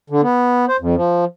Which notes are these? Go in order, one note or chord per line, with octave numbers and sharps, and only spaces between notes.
D3
B3
C5
F2
F3